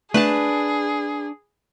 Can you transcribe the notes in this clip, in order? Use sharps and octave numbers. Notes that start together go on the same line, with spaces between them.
A3 D4 G#4 B4 A5